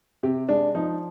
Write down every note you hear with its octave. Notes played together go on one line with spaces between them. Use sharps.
C3 G4
G#3 D4
F3 D#4